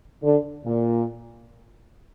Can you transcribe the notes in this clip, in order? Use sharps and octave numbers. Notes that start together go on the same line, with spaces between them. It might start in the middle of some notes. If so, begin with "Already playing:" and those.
D3
A#2